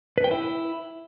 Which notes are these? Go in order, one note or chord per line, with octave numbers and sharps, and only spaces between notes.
B4
G5
E4